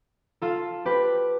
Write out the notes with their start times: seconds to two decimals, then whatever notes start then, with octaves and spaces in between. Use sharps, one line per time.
0.42 F4 A4
0.85 G4 B4